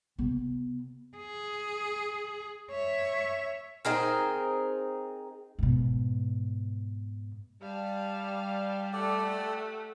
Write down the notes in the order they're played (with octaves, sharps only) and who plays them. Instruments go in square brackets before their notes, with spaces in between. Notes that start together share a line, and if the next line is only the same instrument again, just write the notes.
[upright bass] C3 B3
[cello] G#4
C#5 E5
[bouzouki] C4 D#4 G#4 A#4
[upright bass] G#2 B2
[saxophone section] G3 [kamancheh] F5 A5
[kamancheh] A3 F#5 [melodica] G4 A4 D5